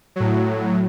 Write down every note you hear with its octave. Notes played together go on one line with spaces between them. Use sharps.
A2 F#3